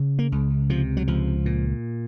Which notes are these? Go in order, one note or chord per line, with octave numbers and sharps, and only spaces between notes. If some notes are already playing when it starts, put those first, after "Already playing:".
Already playing: C#3
A#3
C#2
C3 F3
F#3
C#2 F3
A#2